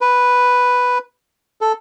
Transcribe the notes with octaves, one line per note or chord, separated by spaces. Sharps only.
B4
A4